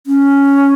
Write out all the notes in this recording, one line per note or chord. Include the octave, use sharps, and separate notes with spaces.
C#4